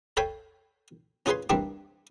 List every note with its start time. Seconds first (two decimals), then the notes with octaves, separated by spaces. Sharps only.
0.17 A4 C#5 F5 G5 G#5 B5
1.26 C#4 F4 G#4 B4 G#5 C6
1.50 G2 G3 A#3 C4 D4 E4